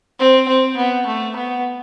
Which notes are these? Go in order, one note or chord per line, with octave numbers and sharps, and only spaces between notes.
C4
C4
B3
A3
B3